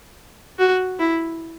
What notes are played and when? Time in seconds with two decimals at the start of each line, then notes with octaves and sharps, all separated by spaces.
0.59 F#4
0.99 E4